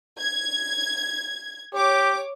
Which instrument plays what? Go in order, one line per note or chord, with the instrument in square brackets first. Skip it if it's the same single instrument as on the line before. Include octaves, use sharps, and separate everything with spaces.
[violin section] G#6
[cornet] G4 [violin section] C#5 D6